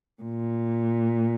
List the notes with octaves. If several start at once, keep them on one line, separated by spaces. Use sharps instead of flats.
A#2